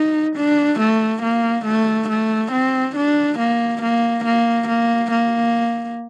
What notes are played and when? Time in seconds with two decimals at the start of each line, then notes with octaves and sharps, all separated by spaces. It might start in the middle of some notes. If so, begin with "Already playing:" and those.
Already playing: D#4
0.36 D4
0.79 A3
1.22 A#3
1.65 A3
2.09 A3
2.52 C4
2.96 D4
3.39 A#3
3.82 A#3
4.24 A#3
4.68 A#3
5.11 A#3